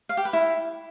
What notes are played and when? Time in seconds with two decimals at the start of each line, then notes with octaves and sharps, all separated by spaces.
0.09 F5
0.17 G4
0.25 B4
0.33 E4